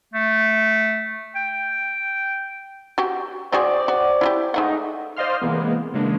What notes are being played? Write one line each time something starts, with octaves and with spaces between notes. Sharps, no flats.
A3
G5
F#4 G4
C4 F#4 G#4 C5 D5
F#4
E4 F#4 G4
G#3 A3 D#4 F#5
C5 D5 D#5 F5 C6 F6
C3 E3 G#3 A#3 B3
C#3 E3 G#3 A#3 D4